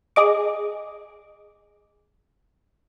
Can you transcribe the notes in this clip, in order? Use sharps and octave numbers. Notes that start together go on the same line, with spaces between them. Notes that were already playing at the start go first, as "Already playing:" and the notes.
G#4 D#5 D6